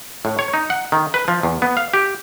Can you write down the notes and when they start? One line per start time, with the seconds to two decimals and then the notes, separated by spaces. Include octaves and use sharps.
0.25 A2
0.39 C#5
0.54 D#4
0.70 F#5
0.92 D#3
1.14 B4
1.28 F3
1.43 E2
1.62 B3
1.77 F5
1.94 G4